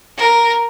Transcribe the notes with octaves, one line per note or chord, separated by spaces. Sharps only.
A#4